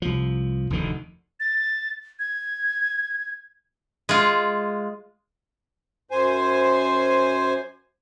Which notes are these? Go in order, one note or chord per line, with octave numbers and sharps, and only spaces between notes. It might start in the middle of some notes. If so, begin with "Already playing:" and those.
C2 F3
F1 D2 D3 D#3
A6
G#6
G#3 F4
F#2 C5 G#5